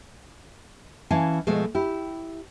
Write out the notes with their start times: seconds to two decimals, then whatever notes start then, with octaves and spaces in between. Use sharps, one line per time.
1.10 E3 C#4 E4 F5 A5
1.47 B2 F3 G#3 A3
1.75 E4 G4